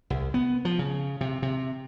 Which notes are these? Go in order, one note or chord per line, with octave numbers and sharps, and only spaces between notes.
C2
B3
F3
C#3
C3
C3